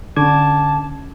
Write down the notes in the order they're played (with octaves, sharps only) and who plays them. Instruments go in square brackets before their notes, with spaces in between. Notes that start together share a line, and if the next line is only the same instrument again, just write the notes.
[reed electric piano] D3 D6 G#6 [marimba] C#4 [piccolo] A5